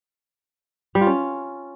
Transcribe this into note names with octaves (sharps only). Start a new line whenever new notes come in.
G3
F4
C#4